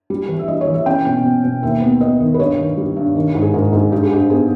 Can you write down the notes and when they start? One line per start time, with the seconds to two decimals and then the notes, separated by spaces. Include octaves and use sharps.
0.10 G3
0.29 E3
0.39 E5
0.48 G3 D#5
0.61 C#5
0.67 E3
0.74 E5
0.86 C#4 G5
1.06 B2
1.25 B2
1.44 B2
1.62 D#2 E5
1.82 B3
2.01 B3 D#5
2.20 D#3
2.34 B4
2.39 G2 C#5
2.58 D#3
2.77 G3
2.96 G2
3.15 D#3
3.35 G#2
3.42 G#4
3.54 G#2 A#4
3.72 G#2 G#4
3.92 G2 G4
4.03 G#4
4.11 G2 G4
4.30 B3 G#4